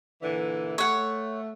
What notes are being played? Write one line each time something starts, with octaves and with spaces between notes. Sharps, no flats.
A#2 D3 E3
A3 C#5 F#5